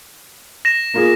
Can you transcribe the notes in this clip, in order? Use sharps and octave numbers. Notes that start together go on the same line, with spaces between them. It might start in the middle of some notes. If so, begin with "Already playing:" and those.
A#6 E7
A#3 F4 G#4